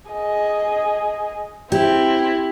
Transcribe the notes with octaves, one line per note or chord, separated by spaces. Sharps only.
G#4 D#5
C4 E4 G4